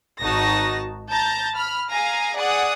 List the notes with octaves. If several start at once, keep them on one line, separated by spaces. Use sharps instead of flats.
G#1 D#4 F#4 A5 A#6
A5 A#5 G6 A6
B5 F6
G#4 F5 G#5 A#5
G#4 D5 F#5 D#6